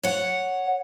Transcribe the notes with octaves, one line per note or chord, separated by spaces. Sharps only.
C#5 F#5